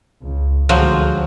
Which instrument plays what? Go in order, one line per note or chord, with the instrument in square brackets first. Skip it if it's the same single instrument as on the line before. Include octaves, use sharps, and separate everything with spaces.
[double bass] C#2
[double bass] D2 G#3 [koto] F3 F#3